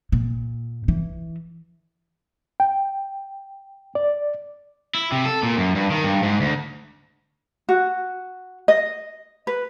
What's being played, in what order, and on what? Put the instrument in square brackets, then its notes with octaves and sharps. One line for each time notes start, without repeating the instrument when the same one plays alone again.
[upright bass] A#2
E3
[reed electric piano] G5
D5
[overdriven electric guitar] E4
C3
A4
A#2
F#2
G2
D#3
G2
G#2
D2
[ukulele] F#4
D#5
B4